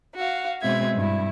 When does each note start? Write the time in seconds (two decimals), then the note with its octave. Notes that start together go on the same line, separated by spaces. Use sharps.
0.15 F#4 F5
0.61 B2 G#3 C4 E5 G#6
0.95 G2 E4